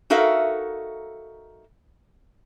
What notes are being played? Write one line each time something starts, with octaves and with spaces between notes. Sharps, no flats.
D#4 F#4 A4 A#4 E5 F5